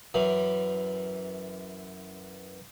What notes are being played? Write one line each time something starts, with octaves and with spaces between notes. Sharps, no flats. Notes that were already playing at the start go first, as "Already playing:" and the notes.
F#2 E3